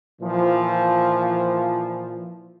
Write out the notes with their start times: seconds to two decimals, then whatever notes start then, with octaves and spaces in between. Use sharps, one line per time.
0.22 A#2 E3 F3